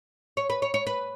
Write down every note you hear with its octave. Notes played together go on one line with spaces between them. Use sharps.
C#5
B4
C#5
C#5
B4